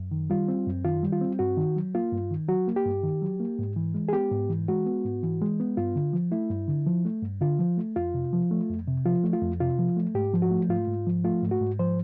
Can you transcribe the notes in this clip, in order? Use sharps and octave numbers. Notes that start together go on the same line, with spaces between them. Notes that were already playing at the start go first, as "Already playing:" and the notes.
Already playing: F#2
D#3
G3 F4
C4
F#2
D#3 F4
G3
F4
C4
G2 F#4
D#3
F#3
A#3 F4
G2
D#3
F#3 F#4
A#3
G4
G2
D#3
F#3
A#3
G#2
E3
G#3
G#4
B3 G4
G#2
E3
G#3 F#4
B3
G#2
E3
G#3
B3
G2 F4
D3
F3
A3 E4
G2
D3
F3
A3
G2
D3 F4
F3
A3
F2 F4
C3
F3
A3
F2
C3
F3 F4
A3
F4
F2
C3 F4
F3
A3
G#2 G4
F3
F#4
A3
G#2 F4
G#2
F3
A3 F4
G#2
F#4
G#2
F3 C5